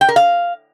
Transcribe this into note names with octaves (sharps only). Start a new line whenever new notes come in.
G5
A#4
F5